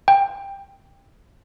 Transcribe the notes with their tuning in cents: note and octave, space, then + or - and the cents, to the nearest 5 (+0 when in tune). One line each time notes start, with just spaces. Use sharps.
G5 +15